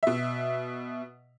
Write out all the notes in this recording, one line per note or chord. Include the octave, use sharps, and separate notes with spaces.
B2 E5